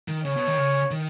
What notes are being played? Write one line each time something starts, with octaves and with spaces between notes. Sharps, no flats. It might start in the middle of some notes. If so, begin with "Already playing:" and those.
D#3
C#3 C#5
B2
D#3
C#3
D#3